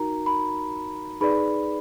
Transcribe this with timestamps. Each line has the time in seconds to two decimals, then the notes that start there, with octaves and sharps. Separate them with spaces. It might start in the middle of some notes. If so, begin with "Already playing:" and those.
Already playing: D#4 F#4 A#4 A#5
0.26 B5
1.21 D#4 G#4 B4 D5 B5